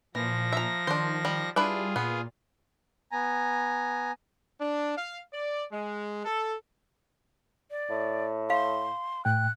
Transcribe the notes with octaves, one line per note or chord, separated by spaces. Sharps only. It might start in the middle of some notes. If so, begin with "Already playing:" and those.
A#2 E3 F3 A#6
E5 A#5
D#3 D4 C5
G3
G3 D4 E4 F4 G#4 B4
A#2 B3
B3 G#5 A#5
D4
F5
D5
G#3
A4
D5
A2
F5 C6
A2 G5 F#6